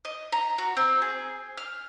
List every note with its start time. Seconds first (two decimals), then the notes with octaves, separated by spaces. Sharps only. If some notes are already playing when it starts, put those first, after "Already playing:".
0.05 D#5
0.32 A#5
0.58 F#4
0.77 C4
1.02 G#4
1.57 F6